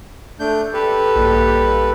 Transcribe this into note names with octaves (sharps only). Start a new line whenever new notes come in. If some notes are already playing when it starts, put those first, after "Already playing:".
A3 D4 G6
G4 A4 B4
A#1 G2